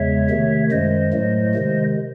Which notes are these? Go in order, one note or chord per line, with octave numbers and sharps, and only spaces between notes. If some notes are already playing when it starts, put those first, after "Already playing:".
Already playing: E2 C#3 G#3 C#5 E5
C3 D#3 A3
F#2 D#3 G#3 C5 D#5
A2 F#3 A3
C3 D#3 G#3